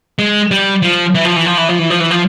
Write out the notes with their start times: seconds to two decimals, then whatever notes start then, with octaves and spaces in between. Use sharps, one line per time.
0.19 G#3
0.51 G3
0.82 F3
1.14 E3
1.25 F3
1.36 E3
1.46 F3
1.57 E3
1.69 F3
1.79 E3
1.90 F3
2.00 E3
2.11 F3